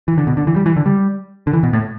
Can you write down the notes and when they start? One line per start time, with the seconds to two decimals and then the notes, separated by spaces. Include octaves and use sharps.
0.08 E3
0.18 D3
0.27 B2
0.37 D3
0.47 E3
0.56 G3
0.66 E3
0.76 D3
0.86 G3
1.47 D3
1.53 E3
1.63 B2
1.73 A2